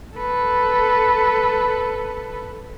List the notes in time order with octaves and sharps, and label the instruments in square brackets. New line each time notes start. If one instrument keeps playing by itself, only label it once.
[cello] A4 B4